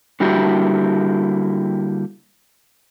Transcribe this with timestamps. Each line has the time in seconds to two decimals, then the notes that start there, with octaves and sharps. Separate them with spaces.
0.20 D3 G3 A#3 E4 F#4 G4